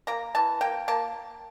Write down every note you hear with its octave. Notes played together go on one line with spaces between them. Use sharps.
A#3 A#5
E3 A5
A#3 G5
A#3 A5